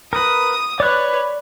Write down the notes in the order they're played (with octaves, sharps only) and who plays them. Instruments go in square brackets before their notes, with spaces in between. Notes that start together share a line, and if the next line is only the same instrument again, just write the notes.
[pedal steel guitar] A#4 B4 [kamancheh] D#6
[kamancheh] B4 C#5 [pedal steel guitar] D5 F#6